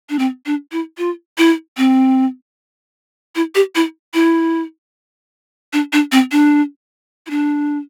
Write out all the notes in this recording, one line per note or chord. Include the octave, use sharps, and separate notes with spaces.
D4
C4
D4
E4
F4
E4
C4
E4
G4
E4
E4
D4
D4
C4
D4
E4
D4